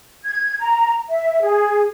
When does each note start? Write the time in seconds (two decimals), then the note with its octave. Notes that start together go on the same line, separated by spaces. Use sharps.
0.24 G#6
0.59 A#5
1.09 E5
1.41 G#4